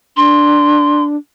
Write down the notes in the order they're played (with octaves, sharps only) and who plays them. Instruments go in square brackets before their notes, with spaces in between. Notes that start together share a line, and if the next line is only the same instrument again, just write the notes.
[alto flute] D4 [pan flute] C6